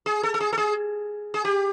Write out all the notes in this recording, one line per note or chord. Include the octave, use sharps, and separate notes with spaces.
G#4
A4
A4
G#4
A4
G#4
G#4
G4